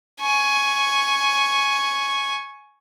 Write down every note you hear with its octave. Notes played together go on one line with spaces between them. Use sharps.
G#5 C#6